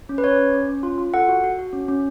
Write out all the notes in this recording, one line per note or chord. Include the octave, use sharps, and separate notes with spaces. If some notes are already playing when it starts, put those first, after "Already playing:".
C#4
B4
C#4 C#5
C#4
C#4
C#4
F4
F4
A4 F#5
F#4
F#4
F#4
C#4
C#4